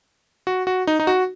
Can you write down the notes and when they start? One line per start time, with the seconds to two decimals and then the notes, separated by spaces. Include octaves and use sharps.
0.47 F#4
0.67 F#4
0.87 D#4
1.00 D#4
1.07 F#4